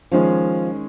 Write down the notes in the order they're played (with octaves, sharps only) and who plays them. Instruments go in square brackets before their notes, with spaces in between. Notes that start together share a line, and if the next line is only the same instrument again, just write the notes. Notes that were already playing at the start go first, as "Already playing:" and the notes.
[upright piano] D#3 G#3 C#4 [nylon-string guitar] F3